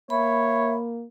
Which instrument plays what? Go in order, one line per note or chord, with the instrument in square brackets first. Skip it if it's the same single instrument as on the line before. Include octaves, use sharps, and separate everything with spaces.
[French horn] A#3 [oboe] C#5 [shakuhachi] E5 [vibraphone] B5